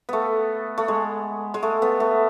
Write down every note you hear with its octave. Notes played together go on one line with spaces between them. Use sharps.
A3 B3
A3
G#3
G#3
A3
B3
A3